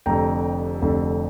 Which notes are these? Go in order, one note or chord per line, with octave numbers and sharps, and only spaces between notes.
F1 F2 D3 G5 A#5
F1 F2 D3